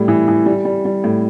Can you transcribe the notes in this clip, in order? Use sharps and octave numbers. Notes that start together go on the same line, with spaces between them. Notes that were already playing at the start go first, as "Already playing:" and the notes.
Already playing: A2 G3
E3
E3
G3
G3
G3
A2